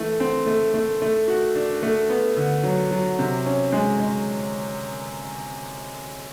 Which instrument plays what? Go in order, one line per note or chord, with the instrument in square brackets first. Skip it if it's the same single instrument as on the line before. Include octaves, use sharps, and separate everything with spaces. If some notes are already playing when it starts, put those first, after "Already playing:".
Already playing: [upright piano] E3 A3
C4
A3
A3
A3
F#4
D4
A3
B3
D3
F#3
F#3
C3
C#4
G#3
G#3